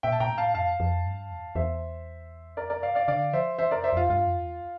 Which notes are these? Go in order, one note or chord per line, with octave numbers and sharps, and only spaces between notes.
A#2 E5 G5
A5
A#2 G5 A#5
A2
F5 A5
F2 F5 A5
F2
G2
E2
E2 C5 E5
F2 A#4 D5
A#4 D5
G2 D5 F5
D5 F5
D3 D5 F5
F3 C5 E5
E3 C5 E5
F2 A#4 D5
C5 E5
F2 F4
G2 F4
F2
E2